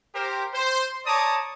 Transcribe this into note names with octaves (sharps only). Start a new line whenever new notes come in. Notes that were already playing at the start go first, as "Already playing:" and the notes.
G4 A#4 C5
C5
C#5 D5 A5 A#5 D6 D#6